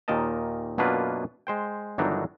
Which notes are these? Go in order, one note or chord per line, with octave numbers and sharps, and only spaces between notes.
D#2 A#2 D#3 A#4 D#5 A5
F#2 B2 A#3 D4 F4 B4
G#3 C5 G5
G1 D#3 E3 F#3 D4 D#4